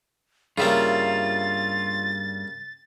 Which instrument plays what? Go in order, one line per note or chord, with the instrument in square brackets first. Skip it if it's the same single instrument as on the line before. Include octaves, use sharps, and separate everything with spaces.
[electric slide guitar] G2 E5 A#5 [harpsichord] C#3 G3 A#3 [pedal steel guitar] F4 [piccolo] A6